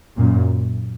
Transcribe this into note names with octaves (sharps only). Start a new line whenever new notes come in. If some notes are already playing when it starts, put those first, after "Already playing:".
F#2 A#2